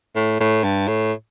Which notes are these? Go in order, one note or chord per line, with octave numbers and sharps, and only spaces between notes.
A2
A2
G2
A2